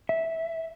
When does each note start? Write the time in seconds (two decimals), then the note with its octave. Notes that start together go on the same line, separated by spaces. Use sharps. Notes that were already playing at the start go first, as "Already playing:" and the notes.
0.09 E5